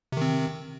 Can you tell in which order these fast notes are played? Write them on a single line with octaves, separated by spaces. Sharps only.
C3 D#3 C4